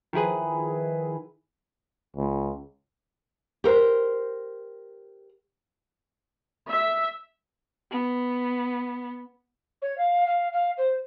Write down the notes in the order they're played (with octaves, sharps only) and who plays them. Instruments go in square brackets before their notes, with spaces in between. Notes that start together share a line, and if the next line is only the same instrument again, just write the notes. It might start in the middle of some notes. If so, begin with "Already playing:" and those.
[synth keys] D#3 F3 E4 G#4 B4
[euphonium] C#2
[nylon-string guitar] G4 A#4 C5
[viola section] E5
[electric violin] B3
[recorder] C#5
F5
F5
F5
C5